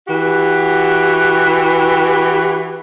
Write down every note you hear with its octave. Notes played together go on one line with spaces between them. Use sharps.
E3 F#4 G4